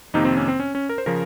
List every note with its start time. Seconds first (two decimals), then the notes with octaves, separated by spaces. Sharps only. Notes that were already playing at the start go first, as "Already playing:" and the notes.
0.14 F2 C3 D#3 A#3 D#4
0.25 C4
0.37 C#4
0.48 C4
0.60 C#4
0.75 C#4
0.89 A#4
0.98 C5
1.06 C#3 F3 A#4